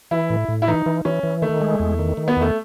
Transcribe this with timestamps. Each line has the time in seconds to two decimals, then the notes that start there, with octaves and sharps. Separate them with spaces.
0.11 E3 E4
0.30 A2
0.48 A2
0.62 E4
0.68 E3 D#4
0.86 E3
1.05 E3 C#4
1.23 E3
1.42 D#3 A3
1.61 G#3
1.80 E2
1.99 D#3
2.17 D#3
2.28 B3
2.36 E2 A3